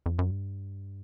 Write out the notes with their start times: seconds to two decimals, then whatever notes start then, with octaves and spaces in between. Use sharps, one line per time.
0.06 F2
0.19 F#2
0.31 G2